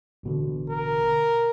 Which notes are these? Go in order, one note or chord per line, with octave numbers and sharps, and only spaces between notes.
A1 B2 D3
A#4